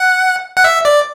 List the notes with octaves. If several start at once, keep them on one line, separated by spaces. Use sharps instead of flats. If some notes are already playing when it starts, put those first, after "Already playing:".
Already playing: F#5
F#5
E5
D5